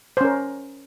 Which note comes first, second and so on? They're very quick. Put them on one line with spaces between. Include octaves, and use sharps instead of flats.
C5 C#4 A#4